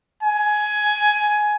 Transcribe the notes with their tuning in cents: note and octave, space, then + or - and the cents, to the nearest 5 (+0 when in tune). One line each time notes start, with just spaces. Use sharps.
G#5 +15